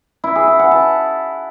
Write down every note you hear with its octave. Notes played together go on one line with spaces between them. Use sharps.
E4
G#4
E4
F#5
A5